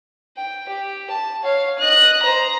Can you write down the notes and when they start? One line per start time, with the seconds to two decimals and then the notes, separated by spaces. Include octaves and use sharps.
0.37 G5
0.68 G4
1.09 A5
1.43 C#5 F5
1.78 D#5 F#6
2.22 C5 A#5